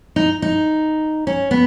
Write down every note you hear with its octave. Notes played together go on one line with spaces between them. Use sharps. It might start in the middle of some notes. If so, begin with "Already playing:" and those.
D#4
D#4
C#4
B3